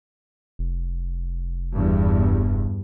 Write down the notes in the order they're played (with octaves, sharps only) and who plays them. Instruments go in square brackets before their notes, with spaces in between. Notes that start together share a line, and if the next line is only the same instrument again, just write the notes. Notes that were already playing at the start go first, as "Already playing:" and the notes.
[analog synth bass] F1
[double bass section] E2 G2